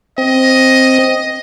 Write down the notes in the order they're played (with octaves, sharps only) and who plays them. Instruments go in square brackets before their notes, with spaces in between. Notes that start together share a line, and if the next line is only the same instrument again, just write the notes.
[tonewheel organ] C4 [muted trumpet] D#5